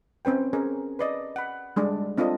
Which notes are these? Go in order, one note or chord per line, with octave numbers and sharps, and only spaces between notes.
C4 C#4 B4 G5
C#4 G#4 A#4
B4 D5 D#5
F#5 B5
G3 G#3 D4 D5
C4 D4 F4 A4 D#5